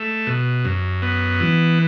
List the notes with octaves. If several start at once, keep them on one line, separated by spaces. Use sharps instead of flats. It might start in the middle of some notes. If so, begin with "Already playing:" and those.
Already playing: A3
B2
F#2
B3
E3